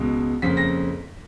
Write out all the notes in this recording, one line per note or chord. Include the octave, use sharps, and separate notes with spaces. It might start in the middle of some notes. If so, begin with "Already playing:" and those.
Already playing: C#2 B2 G#3
F2 C#3 F3 A#3 B6
A#6